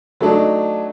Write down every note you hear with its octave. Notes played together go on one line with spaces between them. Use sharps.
F#3 A3 D4 D#4